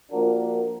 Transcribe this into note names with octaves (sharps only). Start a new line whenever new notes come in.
F3 A#3 D4 F#4 A#4